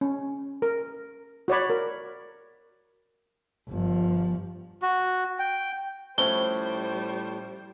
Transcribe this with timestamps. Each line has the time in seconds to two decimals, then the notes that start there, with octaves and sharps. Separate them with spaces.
0.01 C#4
0.62 A#4
1.48 F#4 C#5 D5 B5
1.70 A#4
3.69 G1 F3
4.82 F#4
5.39 G5
6.18 A2 F3 G3 C#4 E4 C5 G7